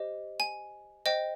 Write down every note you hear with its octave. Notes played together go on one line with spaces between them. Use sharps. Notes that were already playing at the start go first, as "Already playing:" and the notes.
Already playing: G4 C5 D#5
G#5
C5 D#5 G5